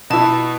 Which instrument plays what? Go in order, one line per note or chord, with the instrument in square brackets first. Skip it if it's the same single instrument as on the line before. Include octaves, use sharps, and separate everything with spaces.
[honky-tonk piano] B2 B3 E4 [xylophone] A5